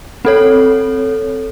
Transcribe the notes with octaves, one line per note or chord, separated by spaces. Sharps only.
C4 A4 C#5